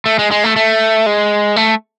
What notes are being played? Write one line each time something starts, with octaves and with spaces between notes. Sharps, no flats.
A3
G#3
G#3
A3
A3
G#3
A3